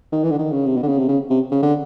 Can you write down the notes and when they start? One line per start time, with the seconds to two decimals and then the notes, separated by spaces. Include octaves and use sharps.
0.12 D#3
0.24 E3
0.31 D3
0.39 D#3
0.52 C#3
0.66 C3
0.77 B2
0.83 D3
0.88 C#3
0.98 C3
1.08 C#3
1.30 C3
1.52 C#3
1.62 D3